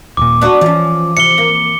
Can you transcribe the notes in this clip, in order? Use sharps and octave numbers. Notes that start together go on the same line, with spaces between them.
D#1 A#2 D6
B3 D4 F#4
E3 F3 C#4
C3 C#7 G7
A#3